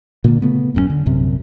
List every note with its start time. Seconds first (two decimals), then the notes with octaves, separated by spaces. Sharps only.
0.24 A#2 D3 A#3
0.42 C#3 A3 B3
0.75 D#1 F#2 A#3 C#4
0.90 D3
1.06 A#1 F#2 C3